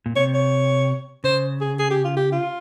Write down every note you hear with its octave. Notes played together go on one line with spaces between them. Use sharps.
A#2
C3 C#5
C#5
C#3 C5
G#4
G#4
G4
F4
G4
F4